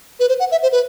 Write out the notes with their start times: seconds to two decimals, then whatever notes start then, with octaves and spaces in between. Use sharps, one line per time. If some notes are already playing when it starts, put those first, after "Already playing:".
0.20 B4
0.29 C5
0.40 F#5
0.52 E5
0.63 C5
0.72 B4